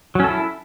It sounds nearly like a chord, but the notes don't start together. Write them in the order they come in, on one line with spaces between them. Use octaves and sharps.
F#3 C#4 A4 E4